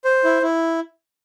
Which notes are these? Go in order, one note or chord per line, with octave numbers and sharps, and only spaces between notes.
C5
E4
E4